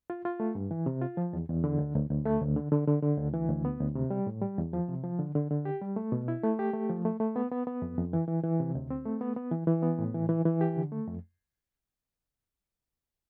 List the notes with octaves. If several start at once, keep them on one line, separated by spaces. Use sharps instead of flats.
F4
F4
A3
G2
E3
C3
F4
F3
E2
E2
D3
D2
D2
D2
A3
D2
D3
D3
D3
D3
D2
E3
D2
B3
D2
C3
G3
A2
G3
E2
F3
C3
F3
D3
D3
D3
G4
G3
A3
B2
E4
A3
G4
A3
F3
A3
A3
B3
B3
B3
F2
F2
E3
E3
E3
C3
D2
C4
A3
B3
B3
E3
E3
B3
A2
E3
E3
E3
G4
D3
A3
F2